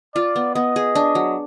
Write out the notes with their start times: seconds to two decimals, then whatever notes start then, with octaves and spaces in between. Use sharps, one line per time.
0.15 F4 D5
0.36 B3
0.55 B3 D#5
0.76 G#4
0.95 D4
1.15 F#3